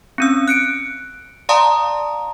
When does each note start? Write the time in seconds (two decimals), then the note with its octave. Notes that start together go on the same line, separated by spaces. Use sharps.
0.18 C4 C#4 E6
0.48 F#6 C#7 D7
1.49 D5 F5 A5 A#5 C6 D#6